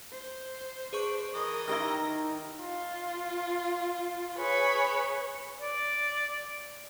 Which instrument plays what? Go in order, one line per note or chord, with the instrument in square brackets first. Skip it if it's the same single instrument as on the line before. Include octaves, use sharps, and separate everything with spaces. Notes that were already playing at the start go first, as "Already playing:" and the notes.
[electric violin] C5
[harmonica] D4 [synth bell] G#4 B4 C#6
[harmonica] E3 D#5 D#6 [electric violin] A#4
[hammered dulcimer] D#3 D#4 E4 [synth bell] G4 F6 [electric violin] A#6
[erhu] F4
[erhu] G#4 [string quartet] B4 C#5
[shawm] D5